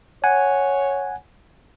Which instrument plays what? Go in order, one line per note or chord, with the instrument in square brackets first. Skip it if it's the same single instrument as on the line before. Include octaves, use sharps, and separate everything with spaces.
[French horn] C#5 [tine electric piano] F#5 G#5